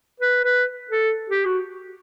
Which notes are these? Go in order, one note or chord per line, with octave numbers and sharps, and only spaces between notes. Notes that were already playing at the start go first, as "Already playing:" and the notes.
B4
B4
A4
G4
F#4